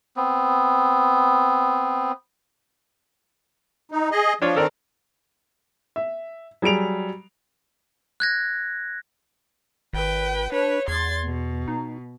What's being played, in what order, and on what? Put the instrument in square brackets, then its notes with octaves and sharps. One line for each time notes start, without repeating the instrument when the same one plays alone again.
[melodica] B3 C4
[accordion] D#4
G#4 D#5
[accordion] F3 [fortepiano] D4 F4 C#5
[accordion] D#3 C4 [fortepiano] A4 A#4 D5
[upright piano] E5
F#3 G3 G#4 D7 F7
[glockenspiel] F#6 G#6 A#6
[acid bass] G#1 [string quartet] B4 G5
[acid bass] D4 [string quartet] B4 C#5
[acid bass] E2 [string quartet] C6 G#6 A6
[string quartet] B2
[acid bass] D#4